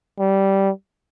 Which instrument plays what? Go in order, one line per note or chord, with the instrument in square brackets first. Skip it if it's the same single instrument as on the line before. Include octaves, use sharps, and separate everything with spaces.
[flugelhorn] G3